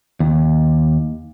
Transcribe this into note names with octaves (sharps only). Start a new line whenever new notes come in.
D#2